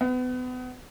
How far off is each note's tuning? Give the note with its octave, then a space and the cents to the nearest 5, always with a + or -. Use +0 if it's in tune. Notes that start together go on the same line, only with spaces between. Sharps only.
B3 +30